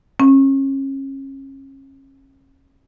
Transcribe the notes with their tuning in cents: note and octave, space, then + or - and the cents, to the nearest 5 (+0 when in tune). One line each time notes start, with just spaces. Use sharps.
C#4 -35